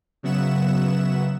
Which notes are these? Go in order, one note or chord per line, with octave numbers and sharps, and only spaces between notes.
C#3 F#3 B3 E5 F#5 E7